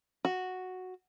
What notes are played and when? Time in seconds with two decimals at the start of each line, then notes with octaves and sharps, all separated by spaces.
0.25 F#4